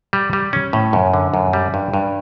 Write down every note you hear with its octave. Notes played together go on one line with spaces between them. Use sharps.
G3
G3
C#4
A2
F#2
D3
F#2
G3
G2
G2